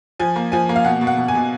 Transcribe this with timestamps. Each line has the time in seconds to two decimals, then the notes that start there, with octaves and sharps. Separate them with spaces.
0.20 F3 G#5
0.36 A#3
0.52 F3 G#5
0.69 A#3
0.76 F5
0.85 B2 F#5
1.01 B2
1.07 F#5
1.17 B2
1.28 G#5
1.35 B2